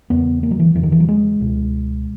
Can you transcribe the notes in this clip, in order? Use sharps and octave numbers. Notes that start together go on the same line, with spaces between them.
E2 C#3 B3
A#3
F#3
E3
E2 C#3 E3
D#3
E3
F#3
G#3
C#2 B2